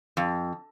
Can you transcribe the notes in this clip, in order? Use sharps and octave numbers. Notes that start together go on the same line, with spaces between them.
F2